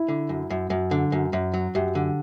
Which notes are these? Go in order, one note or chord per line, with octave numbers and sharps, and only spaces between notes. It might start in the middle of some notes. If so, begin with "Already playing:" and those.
Already playing: E4
D3
F#2
F#2
F#2
D3
F#2
F#2
F#3
F#2 G4
D3